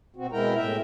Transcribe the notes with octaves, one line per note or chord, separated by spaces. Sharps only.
B2 C4 F#4
B2 G#3 E4 A#4 G5 A#5
A2 E5 G5